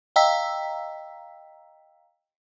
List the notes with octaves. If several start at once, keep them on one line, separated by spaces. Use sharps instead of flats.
D#5 F5 G5 A#5 E6 B6